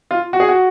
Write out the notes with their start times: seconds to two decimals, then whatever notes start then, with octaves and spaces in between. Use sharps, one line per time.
0.11 F4
0.33 F#4
0.40 G#4
0.49 F#4